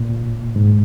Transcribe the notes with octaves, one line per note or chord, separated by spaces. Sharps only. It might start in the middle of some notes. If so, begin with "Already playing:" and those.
Already playing: A#2
G#2